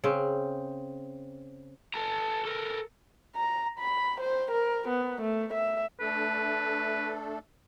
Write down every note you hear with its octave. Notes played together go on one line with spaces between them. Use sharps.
C#3 C4
A4 A#5
A4 A#4
A#5
B5
C5
A#4
B3
A3
E5
A3 D4 A4 B4